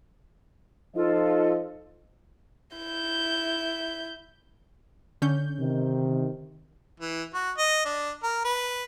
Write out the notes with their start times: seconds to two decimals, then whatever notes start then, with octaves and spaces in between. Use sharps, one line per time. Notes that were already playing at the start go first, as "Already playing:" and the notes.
0.95 F3 D#4 F4 A4 D#5
2.77 E4 G6
5.22 D3 C#4 G6
5.59 C3 D#3
7.00 E3
7.34 F#4
7.58 D#5
7.85 D4
8.23 A#4
8.45 B4